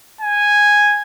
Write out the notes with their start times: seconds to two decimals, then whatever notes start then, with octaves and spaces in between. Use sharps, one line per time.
0.21 G#5